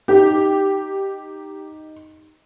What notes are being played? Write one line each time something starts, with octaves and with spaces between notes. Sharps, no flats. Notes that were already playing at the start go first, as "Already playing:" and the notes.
D#4 G4